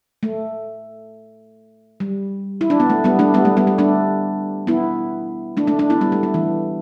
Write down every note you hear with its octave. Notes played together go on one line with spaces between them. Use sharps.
A3
G3
E4
D4
B3
A3
G3 B3
A3 D4
G3 B3
A3
G3 B3
A3
A3 D4
B3 E4
A3 D4
A3 D4
A3 D4
B3 E4
G3 B3
A3
A3
E3